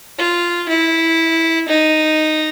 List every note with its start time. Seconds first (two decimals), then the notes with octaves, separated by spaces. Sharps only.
0.18 F4
0.69 E4
1.68 D#4